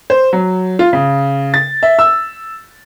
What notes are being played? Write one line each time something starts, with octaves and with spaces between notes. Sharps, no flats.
C5
F#3
F4
C#3
A6
E5
E6